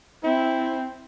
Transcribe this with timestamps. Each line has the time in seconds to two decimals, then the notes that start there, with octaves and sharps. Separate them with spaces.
0.23 C4 E4